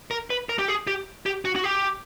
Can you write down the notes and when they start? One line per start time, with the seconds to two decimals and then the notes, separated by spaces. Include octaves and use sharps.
0.11 A#4
0.30 B4
0.49 A#4
0.59 G4
0.68 G#4
0.87 G4
1.26 G4
1.45 F#4
1.56 F#4
1.64 G4